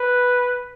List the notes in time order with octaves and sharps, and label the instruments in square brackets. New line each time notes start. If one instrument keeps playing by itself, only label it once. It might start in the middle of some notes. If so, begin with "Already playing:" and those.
Already playing: [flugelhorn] B4